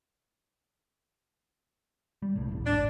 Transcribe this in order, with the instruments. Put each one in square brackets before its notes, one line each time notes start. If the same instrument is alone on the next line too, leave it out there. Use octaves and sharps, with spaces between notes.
[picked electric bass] G3
C2 A2
D1 A1 E2
[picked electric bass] G#1 [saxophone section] D4